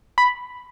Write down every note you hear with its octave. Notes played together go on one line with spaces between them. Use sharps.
B5